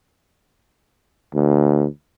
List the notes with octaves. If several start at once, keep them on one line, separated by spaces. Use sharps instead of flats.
D2